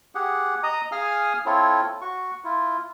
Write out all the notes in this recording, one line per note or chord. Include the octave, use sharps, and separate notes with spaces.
G4 G#4 F#5
D#5 A#5 D#6
G#4 F5 G#5 D#6 F6
C4 E4 F4 A4 C#5
F#4 C#6
E4 F4